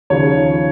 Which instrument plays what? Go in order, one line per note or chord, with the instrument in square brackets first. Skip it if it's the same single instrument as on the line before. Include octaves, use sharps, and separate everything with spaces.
[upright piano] D#2 C#3 F3 C#5